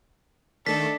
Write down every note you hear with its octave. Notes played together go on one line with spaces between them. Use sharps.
D#3 A3 D4 A4 B6